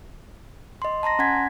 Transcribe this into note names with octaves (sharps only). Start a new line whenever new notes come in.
D#5 C6
A5 A#5 C6 A#6
C#4 F#5 G#5 G#6 B6